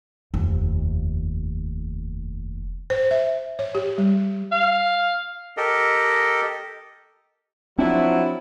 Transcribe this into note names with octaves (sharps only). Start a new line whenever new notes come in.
F1 D#2
C5
E5
C#5
G4
G3
F5
G4 A4 A#4 D#5
F3 F#3 C4 D4 E4